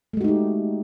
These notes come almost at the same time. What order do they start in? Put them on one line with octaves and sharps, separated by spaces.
A3 G#3 F#4 D#4 G4